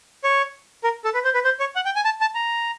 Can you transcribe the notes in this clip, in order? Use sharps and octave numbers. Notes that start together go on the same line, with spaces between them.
C#5
A#4
A4
B4
C5
B4
C5
C#5
F#5
G5
G#5
A5
A5
A#5